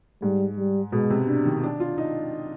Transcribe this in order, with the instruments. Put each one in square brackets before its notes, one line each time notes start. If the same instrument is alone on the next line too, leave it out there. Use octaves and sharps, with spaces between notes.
[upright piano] G#2 [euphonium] G3
[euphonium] G3
[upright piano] B2 [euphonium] G#3
[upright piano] C3
[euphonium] D4
[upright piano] D#3
D4
F4
D#4